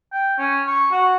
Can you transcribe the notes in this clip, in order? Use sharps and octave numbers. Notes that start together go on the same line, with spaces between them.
G5
C#4
C#6
F#4